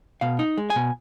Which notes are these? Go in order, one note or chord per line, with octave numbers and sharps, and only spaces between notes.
B2 F5
D#4
G#3
G#5
B2